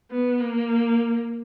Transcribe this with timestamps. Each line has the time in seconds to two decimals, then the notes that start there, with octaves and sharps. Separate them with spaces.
0.11 B3
0.40 A#3